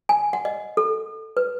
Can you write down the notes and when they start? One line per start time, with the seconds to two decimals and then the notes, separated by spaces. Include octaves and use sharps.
0.09 G#5
0.33 F#5
0.45 D#5
0.77 A4
1.37 B4